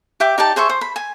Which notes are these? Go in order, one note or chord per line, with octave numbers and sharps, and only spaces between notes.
G4 E5 G5 D6
D#4 G4 D5 A5
G#4 C5 E5 C#6
C5
B5
G#5